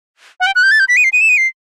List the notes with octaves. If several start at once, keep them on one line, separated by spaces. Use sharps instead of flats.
F#5
G5
F#6
G6
A6
G6
B6
D#7
C7
D#7
E7
D#7
C7